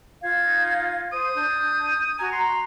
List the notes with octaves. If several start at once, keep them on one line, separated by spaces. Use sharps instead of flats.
F4 F5 G#6
D#4
C5 D#6
D4 G6
F#4 G#5 A#5
C6